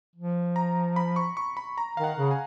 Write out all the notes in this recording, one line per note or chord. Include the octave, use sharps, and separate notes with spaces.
F3
A#5
B5
C#6
C#6
B5
A#5
D#3 F5
F#5
C#3
G#5